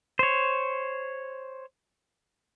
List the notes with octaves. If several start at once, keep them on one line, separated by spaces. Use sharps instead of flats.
C5 C#5